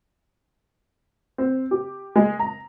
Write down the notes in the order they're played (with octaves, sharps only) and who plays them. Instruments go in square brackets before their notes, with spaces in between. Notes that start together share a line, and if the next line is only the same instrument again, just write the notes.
[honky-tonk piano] C4
G4
G#3
A#5